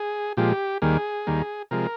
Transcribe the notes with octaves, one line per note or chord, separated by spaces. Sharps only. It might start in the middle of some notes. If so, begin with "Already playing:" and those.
Already playing: G#4
A#2 F3 G#3 G4
D#2 D#3 G3 A#3 G#4
D#2 D#3 G3 A#3
C3 F3 G#3 A#4